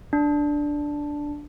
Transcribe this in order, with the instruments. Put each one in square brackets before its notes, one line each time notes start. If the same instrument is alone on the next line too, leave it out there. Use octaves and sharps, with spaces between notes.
[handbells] D4